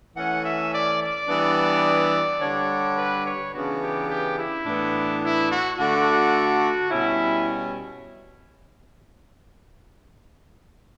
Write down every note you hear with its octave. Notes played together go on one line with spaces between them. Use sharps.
E3 A3 C#4 F#5
E5
D5
D5
E3 G3 B3 D4
D3 G3 D4 C#5
B4
C#5
C#3 E3 B3 D4 F#4
G4
G4
E4
A2 E3 B3 D4
E4
F#4
D3 A3 D4 F#4
B2 G3 C#4 E4